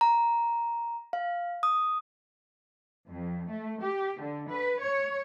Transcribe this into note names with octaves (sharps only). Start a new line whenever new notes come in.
A#5
F5
D#6
F2
A3
G4
D3
B4
C#5